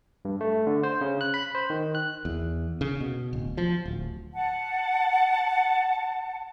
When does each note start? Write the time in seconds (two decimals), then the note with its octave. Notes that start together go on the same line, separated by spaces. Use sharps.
0.25 G2
0.41 A3
0.67 D3
0.83 C5
1.01 C#3
1.21 F#6
1.34 B5
1.55 C5
1.70 D#3
1.95 F#6
2.25 E2
2.81 C#3
3.00 B2
3.33 D1
3.57 F3
3.86 D1
4.35 F#5 A5